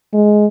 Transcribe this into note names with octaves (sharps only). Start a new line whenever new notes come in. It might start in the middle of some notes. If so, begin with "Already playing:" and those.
G#3